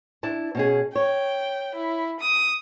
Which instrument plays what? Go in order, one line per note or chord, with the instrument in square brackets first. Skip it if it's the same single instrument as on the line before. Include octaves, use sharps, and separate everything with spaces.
[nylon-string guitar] D4 E4 A5
B2 C#4 G#4
[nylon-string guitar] C#5 [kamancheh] G5
[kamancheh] E4
D#6